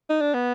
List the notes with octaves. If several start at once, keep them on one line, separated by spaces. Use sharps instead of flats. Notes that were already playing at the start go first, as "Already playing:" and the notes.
D#4
D4
B3